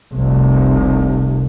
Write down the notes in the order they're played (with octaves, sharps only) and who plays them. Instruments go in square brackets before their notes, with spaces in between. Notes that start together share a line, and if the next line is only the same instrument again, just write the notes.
[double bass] F1 C2